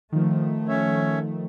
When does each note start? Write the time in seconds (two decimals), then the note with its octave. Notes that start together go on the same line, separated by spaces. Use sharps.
0.12 D#3 F3 A3
0.68 C#4 C#5 E5